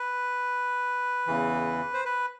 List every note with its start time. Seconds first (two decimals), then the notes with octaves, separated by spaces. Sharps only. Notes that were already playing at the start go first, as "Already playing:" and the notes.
Already playing: B4
1.27 E2 C#3 E3
1.94 C5
2.05 B4